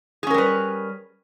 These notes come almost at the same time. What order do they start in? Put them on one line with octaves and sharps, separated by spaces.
G#4 C#4 A#4 G3 B4